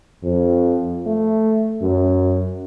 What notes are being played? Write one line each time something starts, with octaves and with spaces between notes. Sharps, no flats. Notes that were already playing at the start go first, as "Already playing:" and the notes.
F2
A3
F#2